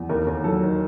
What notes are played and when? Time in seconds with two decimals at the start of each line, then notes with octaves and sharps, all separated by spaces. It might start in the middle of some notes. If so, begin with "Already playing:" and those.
Already playing: E2
0.09 D#2 A#4
0.27 D#2
0.44 F#3 A4
0.62 D#3